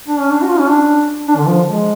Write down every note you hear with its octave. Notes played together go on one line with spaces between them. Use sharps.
D4
C#4
D4
F#4
F4
C#4
D4
D4
D3
F3
G#3